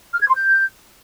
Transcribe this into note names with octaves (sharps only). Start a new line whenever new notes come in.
F6
G#6
C6
G6